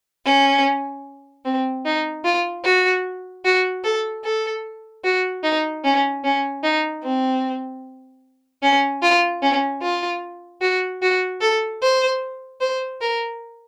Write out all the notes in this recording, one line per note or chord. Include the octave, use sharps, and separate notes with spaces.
C#4
C4
D#4
F4
F#4
F#4
A4
A4
F#4
D#4
C#4
C#4
D#4
C4
C#4
F4
C#4
F4
F#4
F#4
A4
C5
C5
A#4